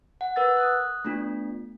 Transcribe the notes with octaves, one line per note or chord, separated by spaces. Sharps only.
F#5
A#4 B4 F#5 E6 A6
D#6 F#6
A3 B3 D4 F4